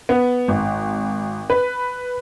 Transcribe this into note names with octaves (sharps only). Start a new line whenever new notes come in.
B3
G#1
B4